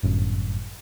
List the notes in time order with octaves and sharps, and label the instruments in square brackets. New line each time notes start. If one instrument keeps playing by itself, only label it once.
[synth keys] G1 F#2 A2